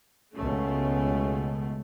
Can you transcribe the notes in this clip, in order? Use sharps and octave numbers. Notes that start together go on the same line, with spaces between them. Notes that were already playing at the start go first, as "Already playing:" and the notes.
C#2 B2 A3 C#4